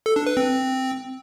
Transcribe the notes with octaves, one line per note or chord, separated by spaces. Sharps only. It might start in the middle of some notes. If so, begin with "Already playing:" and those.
A4
D4
B4
C4